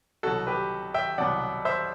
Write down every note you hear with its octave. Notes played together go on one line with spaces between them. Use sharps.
C2 B2 F#3 F#4 A4
G4 B4
E5 G5
C2 B2 F#3 D5 F#5
C5 E5